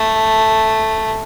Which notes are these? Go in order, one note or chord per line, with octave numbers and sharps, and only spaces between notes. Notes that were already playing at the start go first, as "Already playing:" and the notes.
Already playing: A3